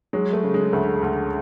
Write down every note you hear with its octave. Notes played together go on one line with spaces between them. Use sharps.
F#3 G#3
A3
C#3
G#3
D2 A3
D2